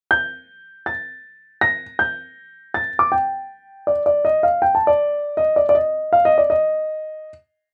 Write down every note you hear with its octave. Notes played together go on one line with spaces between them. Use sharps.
G6
A6
A#6
G6
A6
D6
G5
D5
D5
D#5
F5
G5
A5
D5
D#5
D5
D5
D#5
F5
D#5
D5
D#5